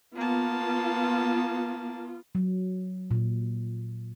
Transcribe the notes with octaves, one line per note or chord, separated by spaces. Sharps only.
A#3 B3 F4 A5
F#3
A#2